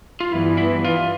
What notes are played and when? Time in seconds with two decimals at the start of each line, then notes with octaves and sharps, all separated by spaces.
0.20 F4
0.32 G2 E3 B3 E4
0.58 E4
0.85 F4